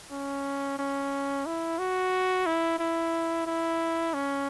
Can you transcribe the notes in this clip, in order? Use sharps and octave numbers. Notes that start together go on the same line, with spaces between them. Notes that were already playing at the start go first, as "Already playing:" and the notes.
C#4
C#4
E4
F#4
E4
E4
E4
C#4